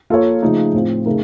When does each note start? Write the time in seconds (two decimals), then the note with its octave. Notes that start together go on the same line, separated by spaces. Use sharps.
0.10 A#3 F4 A4 C#5
0.42 C#3 F3 A3 D#4
0.73 A2 F3 C4 F4
1.06 C#3 A3 D#4 A#4